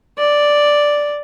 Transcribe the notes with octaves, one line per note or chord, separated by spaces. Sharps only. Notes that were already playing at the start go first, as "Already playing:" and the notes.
D5